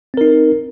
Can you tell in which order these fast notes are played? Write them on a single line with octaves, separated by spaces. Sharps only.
C4 A#4 D#4